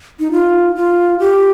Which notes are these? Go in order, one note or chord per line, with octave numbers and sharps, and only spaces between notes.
D#4
F4
F4
G4